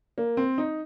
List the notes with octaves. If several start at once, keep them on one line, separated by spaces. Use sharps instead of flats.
A#3
C4
D#4